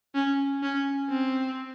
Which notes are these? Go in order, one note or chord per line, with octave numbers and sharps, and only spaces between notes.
C#4
C#4
C4